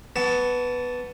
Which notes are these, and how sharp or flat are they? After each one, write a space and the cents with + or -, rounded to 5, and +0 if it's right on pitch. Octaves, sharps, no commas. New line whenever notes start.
B3 +0 A5 +0 C#6 +40